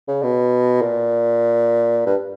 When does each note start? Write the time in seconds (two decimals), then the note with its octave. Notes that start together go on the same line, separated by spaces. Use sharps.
0.08 C#3
0.23 B2
0.82 A#2
2.06 G2